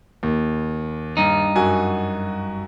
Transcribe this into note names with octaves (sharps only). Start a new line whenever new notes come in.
D#2
G2 D#4
F#2 F#4 G#5